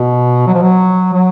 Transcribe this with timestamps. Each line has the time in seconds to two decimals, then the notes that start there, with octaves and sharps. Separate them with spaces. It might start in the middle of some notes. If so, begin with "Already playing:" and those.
Already playing: B2
0.47 F#3
0.54 F3
0.62 F#3
1.13 F#3